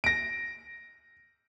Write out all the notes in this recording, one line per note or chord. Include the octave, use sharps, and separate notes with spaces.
A#6 D7